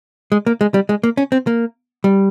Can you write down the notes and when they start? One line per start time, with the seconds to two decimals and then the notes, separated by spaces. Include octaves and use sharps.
0.32 G#3
0.46 A#3
0.61 G#3
0.74 G3
0.89 G#3
1.03 A#3
1.17 C#4
1.32 C4
1.47 A#3
2.04 G3